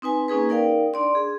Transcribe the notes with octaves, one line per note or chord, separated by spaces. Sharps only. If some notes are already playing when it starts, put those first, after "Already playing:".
C4 D#4 B4 G#5
A#3 C#4 D#4 G#4 B4
D#4 A#4 D5 F5 G5
D4 D5 C6
G#4